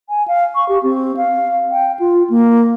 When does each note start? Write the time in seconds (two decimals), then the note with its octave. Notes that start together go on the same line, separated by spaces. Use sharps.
0.09 G#5
0.28 F5
0.55 C#6
0.69 G4
0.83 C4
1.17 F5
1.72 G5
2.00 F4
2.30 A#3